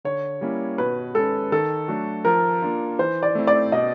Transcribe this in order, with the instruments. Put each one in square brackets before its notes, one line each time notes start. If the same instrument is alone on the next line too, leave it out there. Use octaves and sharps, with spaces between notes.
[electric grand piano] D3 [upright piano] C#5
[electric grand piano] G3 A#3 C#4 E4
[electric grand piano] B2 [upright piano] B4
[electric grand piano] G#3 C#4 [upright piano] A4
[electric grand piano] D#3 [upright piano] A4
[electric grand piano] F#3 A3 D4 F#4
[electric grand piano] F3 [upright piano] A#4
[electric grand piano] A#3 D4 F4
[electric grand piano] E3 [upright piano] C5
[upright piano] D5
[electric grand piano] A3 C4 E4
[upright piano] D5
[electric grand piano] B2 [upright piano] D#5